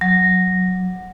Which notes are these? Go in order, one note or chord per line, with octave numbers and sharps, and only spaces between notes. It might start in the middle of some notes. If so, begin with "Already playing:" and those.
F#3